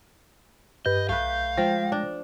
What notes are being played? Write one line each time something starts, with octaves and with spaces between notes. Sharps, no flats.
G2 G4 B4 D#5 G6
B1 A3 B4 F5 G6
F3 G#3 C5 G5 A#6
D4